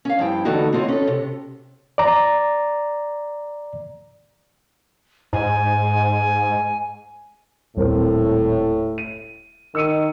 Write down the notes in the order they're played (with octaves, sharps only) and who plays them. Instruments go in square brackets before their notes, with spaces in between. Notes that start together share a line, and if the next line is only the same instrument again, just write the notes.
[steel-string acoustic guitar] C#4 F5
G2 F3 E4 G5
D3 E3 A3 D#4 F#4
C4 D#4 F4 F#4 C#5
C#4 A4
C3
[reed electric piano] D5 A#5
[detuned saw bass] G#2 [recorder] G#5
[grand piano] D#1 C4 A#4 [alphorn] A2
[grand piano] D#7
[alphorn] D#3 [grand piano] E6 C#7 D#7